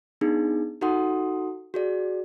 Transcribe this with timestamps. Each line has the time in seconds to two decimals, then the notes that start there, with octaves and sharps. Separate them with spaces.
0.21 B3 D4 D#4 G#4
0.81 D#4 F#4 A4 F#5 C6 D#6
1.74 F#4 G#4 D5